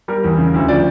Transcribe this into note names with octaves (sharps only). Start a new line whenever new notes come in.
G3 A#4
E2
C#3
D2
F3 D5